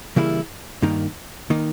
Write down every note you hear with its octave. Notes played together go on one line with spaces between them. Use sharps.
C#3 E3 G3 A#3 E4
G2 D#3 A#3 D#4
D#3 A#3 D#4